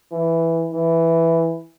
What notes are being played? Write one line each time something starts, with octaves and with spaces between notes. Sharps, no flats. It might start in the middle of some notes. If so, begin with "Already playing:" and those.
E3
E3